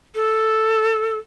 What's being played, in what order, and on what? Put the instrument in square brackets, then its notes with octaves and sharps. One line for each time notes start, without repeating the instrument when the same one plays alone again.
[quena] A4